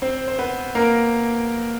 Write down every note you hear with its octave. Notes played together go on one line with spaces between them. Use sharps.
C4 C5
C5
B3 B4
A#3 A#4